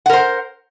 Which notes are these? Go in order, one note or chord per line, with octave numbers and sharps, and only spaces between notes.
A#4 C5 F#5